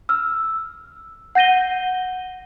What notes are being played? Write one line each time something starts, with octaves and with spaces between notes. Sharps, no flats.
E6 F6
F#5 G6 A#6 D#7 G7